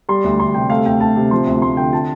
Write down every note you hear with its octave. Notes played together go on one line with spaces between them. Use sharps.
G3 C6
D2
D2 C6
C3 G5
A3 F5
D2 G5
D2 A5
C3
F3 C6
D2
D2 C6
D3 G5
F4 A5